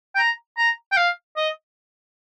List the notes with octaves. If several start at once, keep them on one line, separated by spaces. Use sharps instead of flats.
G5
A#5
A#5
G5
F5
D#5